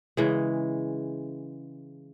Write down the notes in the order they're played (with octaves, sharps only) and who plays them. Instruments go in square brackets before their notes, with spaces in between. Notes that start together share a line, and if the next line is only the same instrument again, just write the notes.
[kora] C#3 E3 G#3